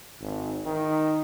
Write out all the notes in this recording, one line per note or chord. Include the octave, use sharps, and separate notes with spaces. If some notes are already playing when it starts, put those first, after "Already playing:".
G#1
D#3